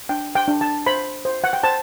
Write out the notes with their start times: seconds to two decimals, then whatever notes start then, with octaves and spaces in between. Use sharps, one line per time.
0.09 D4 G5
0.35 G5
0.48 D4
0.61 A5
0.86 C5 B5
1.25 C5
1.44 F#5
1.53 G5
1.63 C5 A5